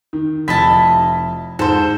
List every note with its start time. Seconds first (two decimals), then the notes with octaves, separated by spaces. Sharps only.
0.13 D#3
0.48 F1 E4 D#5 A5 B6
1.59 G#2 A4 C5